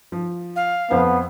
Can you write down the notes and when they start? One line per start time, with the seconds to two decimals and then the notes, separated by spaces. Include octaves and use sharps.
0.12 F3
0.56 F5
0.91 F2 B3 C5